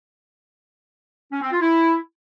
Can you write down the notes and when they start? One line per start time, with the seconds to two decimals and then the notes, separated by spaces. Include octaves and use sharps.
1.31 C#4
1.41 C4
1.51 F4
1.61 E4